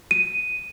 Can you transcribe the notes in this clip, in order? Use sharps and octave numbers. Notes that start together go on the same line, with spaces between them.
D#7